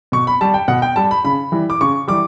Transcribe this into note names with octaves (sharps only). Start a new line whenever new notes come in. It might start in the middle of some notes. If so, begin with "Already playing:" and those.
B2 C#6
B5
G3 A5
G5
B2 F#5
G5
G3 A5
B5
C#3 B5
E3 G3
D6
C#3 C#6
E3 G3 D6